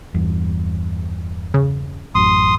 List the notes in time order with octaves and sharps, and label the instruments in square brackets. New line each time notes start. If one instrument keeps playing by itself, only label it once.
[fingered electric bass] E2 G2
[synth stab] C#3
[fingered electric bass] A1 F#2 [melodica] C6 D#6